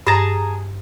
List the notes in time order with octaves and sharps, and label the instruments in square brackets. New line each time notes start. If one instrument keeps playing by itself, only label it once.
[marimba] G2 A#6 [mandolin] G#4 A5 A#5